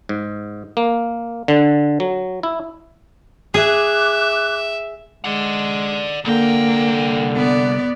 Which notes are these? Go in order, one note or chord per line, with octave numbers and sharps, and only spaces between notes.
G#2
A#3
D3
F#3
E4
G#4 E5 D6 F#6
G#3 D5 F#5
C2 D3 A#3 G5
B3 D5